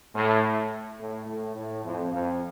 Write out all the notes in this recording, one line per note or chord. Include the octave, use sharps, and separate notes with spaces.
A2
A2
A2
A2
F2
F2